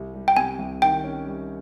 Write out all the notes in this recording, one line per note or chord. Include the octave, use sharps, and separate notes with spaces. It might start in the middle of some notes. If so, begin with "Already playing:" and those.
Already playing: C2
G3
G5
C3 G#5
C2
D#3 G5
C#4
G3